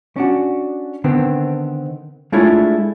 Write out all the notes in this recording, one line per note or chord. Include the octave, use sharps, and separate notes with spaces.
C#4 D4 F#4
D3 D#3 B3 C4
G#3 A3 D4 E4 F4 C#5